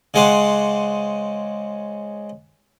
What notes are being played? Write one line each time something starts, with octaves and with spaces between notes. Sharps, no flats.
C#3 G#3 C5 F#5 D6